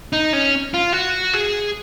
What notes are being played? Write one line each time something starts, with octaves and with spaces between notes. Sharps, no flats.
D#4
C#4
F4
F#4
G#4